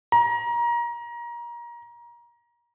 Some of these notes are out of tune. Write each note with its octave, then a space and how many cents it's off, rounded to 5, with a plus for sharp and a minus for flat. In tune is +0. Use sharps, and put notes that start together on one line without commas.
A#5 +25